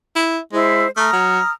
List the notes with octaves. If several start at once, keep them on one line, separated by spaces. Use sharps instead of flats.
E4
G#3 E4 C5
A3 A#5 D#6 F6
F#3